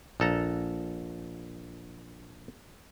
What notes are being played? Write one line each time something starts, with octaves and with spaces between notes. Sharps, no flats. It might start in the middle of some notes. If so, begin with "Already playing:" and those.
A#1 A4 A#5